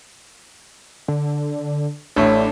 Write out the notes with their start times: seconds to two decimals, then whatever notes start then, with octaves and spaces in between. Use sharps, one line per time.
1.08 D3
2.16 A1 A2 A3 D4